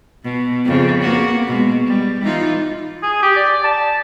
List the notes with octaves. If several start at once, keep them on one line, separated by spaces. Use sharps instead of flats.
B2
F2 C#3
A#3 B3 F#4
B2 G#3
G3
E3 D#4 F4
G#4
G4
D5
A5